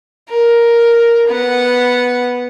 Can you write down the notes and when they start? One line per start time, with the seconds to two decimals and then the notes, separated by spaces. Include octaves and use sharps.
0.29 A#4
1.27 B3 F#5